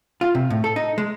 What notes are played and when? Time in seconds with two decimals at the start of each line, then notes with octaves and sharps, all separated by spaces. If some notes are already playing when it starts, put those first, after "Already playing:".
0.21 F4
0.35 C3
0.50 A2
0.64 A4
0.76 D#4
0.98 G#3